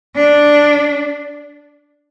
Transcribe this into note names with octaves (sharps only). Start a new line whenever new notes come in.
D4